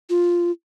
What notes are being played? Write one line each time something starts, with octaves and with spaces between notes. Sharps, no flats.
F4